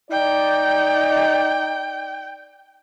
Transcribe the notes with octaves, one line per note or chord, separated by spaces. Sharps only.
D#4 D5 G5